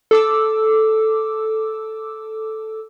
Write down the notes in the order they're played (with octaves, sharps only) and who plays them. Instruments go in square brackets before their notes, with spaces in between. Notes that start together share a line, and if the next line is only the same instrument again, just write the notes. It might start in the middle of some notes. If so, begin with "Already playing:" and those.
[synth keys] A4 D6 E6